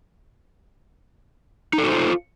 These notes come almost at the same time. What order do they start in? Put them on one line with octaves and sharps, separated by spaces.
D#4 A4 F#4 C5 F4